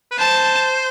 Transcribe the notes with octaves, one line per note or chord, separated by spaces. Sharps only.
B4
C5 A5